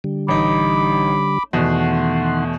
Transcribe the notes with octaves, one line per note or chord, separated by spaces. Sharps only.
D3 G3
A1 D#4 B5 D6
E2 B2 D#3 A3 F#5 C6